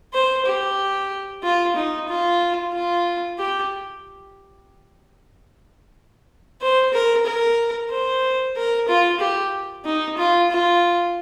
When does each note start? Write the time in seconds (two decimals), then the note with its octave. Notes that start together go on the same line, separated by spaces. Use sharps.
0.13 C5
0.46 G4
1.43 F4
1.76 D#4
2.08 F4
2.73 F4
3.38 G4
6.61 C5
6.93 A#4
7.26 A#4
7.90 C5
8.56 A#4
8.88 F4
9.20 G4
9.85 D#4
10.18 F4
10.50 F4